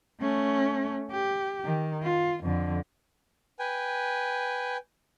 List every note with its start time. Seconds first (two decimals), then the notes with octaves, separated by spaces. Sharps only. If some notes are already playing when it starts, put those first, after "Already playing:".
0.21 A3 C#4
1.11 G4
1.65 D#3
2.03 F4
2.43 F2 D3
3.59 B4 G5 G#5